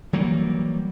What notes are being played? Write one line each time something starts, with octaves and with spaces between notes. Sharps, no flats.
E3 F#3 G3 A#3